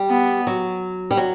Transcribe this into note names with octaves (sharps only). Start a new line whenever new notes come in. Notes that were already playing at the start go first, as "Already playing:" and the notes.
Already playing: G3
B3
F#3
G3
F#3